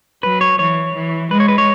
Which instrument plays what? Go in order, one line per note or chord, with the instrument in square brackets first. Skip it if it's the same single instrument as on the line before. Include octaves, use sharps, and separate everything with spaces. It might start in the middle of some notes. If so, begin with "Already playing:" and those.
[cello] F#3 [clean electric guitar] B4
[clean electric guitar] C#5
[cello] E3 [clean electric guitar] C#5
[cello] E3
[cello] G#3 [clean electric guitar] B4
[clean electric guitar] C#5
B4
C#5